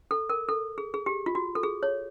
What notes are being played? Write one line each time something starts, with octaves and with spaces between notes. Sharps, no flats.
A4
A#4
A4
G#4
G#4
G4
F4
F#4
A4
G#4
C#5